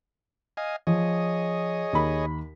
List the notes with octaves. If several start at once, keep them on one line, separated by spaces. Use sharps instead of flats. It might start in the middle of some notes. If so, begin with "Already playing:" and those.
D#5 F5 G#5
F3 G#4 C#5 D#5
D#2 B5